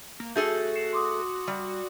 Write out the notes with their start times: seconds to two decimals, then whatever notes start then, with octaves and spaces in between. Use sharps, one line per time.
0.20 A#3
0.36 A3 F#4 G#4 A4 G6
0.75 C7 C#7 E7
0.93 C6 D6 D#6
1.47 G3